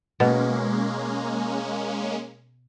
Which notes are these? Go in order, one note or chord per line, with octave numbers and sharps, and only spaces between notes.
B2 G#3 A#3 C#4